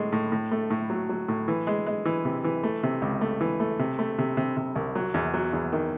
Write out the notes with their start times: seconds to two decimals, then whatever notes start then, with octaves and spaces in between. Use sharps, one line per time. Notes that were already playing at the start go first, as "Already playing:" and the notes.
Already playing: A2 G#3
0.12 A2
0.32 A2
0.51 A3
0.70 A2
0.90 F#3
1.09 F#3
1.28 A2
1.48 E3
1.67 G#3
1.86 G#3
2.05 E3
2.25 C3
2.44 E3
2.63 A3
2.83 C3
3.02 C#2
3.21 A3
3.41 E3
3.60 A3
3.79 C3
3.99 A3
4.19 C3
4.37 C3
4.57 C3
4.76 C2
4.95 F#3
5.14 E2
5.34 F#3
5.53 E2
5.73 D#3